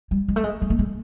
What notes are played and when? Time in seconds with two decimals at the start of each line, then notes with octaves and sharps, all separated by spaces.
0.11 G3
0.28 G#3
0.36 A3
0.44 G#3
0.62 G#3
0.70 A3
0.79 G#3